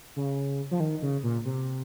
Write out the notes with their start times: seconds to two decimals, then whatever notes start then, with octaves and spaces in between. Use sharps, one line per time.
0.16 C#3
0.71 F3
0.80 D#3
1.02 C#3
1.23 A#2
1.45 C3